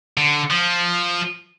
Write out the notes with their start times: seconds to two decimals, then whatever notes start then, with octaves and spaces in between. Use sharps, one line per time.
0.17 D3
0.50 F3